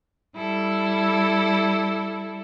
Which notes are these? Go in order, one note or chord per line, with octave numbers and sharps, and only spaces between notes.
G3 E4 A4